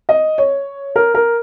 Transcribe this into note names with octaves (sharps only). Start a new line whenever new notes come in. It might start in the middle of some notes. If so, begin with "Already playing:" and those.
D#5
C#5
A#4
A#4